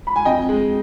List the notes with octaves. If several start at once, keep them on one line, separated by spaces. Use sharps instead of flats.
B5
G#5
F2 D#5 G5
G#3